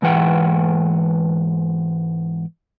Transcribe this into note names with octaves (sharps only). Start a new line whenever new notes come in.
G#2 E3 B4 F#5 G5